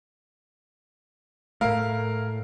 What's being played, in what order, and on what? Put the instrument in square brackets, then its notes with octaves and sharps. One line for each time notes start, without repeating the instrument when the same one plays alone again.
[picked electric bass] A2 A3 [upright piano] A#4 F5